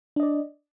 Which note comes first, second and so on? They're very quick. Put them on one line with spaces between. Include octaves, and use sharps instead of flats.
D4 D#5 D5